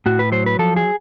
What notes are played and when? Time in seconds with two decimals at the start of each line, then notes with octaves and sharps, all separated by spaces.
0.06 A2 F#4
0.19 B4
0.32 F#3 C5
0.46 B4
0.59 F3 A4
0.76 G#4